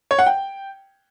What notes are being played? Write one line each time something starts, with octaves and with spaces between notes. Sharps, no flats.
C#5
F#5
G5